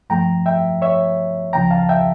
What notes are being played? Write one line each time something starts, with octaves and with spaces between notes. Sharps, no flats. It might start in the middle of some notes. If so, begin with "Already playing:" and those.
G2 F3 A3 G5 A#5
E5 G5
C#5 E5
C#2 C#3 F3 G5 A#5
F5 A5
E5 G5